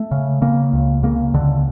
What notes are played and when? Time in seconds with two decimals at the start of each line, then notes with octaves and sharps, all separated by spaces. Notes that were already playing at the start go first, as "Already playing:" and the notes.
Already playing: A3
0.11 C#3
0.42 C#3 A#3
0.73 C#2
1.03 C#3 A#3
1.34 C#2 D3